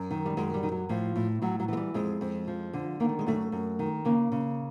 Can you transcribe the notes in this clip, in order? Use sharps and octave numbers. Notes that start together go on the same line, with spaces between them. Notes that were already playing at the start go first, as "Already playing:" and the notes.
Already playing: F#2
D#3
G3
F#2 G#3
G3
D#3
F#3
A2 F3
A2
A2 F#3
F#3
E3 G#3
G3
F2 G#3
F2
F3
D3
D#3 A#3
A3
G#3
F#2 A3
F#2
D#3
C#3 A#3
C#3